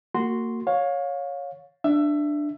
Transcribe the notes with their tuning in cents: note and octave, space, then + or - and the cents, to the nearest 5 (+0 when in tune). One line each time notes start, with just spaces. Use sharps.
A#3 -30 F#4 +0 C6 -5
C#5 +0 F5 +25
D4 +5 E5 +20